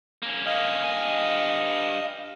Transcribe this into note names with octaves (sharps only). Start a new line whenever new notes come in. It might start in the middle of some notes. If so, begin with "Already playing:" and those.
A#3 C#4
D#5 F5
G2 G#5